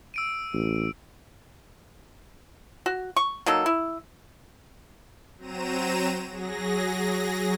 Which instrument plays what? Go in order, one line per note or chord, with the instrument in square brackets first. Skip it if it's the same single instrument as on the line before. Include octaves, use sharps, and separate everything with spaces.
[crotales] E6 D7 D#7
[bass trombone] A1
[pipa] F#4
C#6
F#3 A#3 D#4 A4
E4
[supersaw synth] F#3 C4 A#5 D#7 E7
F#3 G#4 A#6